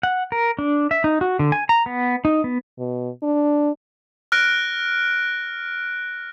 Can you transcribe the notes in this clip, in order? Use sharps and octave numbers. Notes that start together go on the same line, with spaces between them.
F#5
A#4
D4
E5
D#4
F#4
D3
G#5
A#5
B3
D#4
B3
B2
D4
F6 F#6 A#6 D7